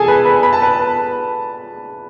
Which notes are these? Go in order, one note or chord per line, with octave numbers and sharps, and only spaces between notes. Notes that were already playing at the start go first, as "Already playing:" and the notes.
Already playing: G#4 A4 G#5 A5
B4 B5
B4 B5
B5
A5
B4 B5